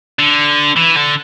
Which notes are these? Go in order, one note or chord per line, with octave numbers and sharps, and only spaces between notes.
D3
E3
D3